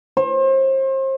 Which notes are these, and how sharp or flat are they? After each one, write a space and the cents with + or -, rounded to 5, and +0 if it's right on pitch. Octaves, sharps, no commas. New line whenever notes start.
C5 +35